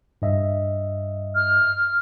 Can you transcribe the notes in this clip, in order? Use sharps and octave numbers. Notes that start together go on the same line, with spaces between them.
G2 D#5 E5
F6